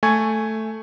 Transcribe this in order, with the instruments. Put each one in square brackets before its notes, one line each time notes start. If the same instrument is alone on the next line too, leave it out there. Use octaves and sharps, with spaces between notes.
[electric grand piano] A3 G#5 C#6 G#6